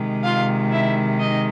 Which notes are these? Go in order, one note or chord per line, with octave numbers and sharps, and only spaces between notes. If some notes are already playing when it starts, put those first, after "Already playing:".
Already playing: C3 D#3 G#3
F4 F5
E4 E5
D#4 D#5